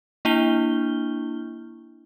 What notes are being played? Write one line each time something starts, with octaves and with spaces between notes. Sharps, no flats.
A#3 D4 E4 G7